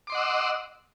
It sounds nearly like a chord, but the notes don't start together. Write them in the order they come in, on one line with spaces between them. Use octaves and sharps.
D6 C6 D#5 F#5 E6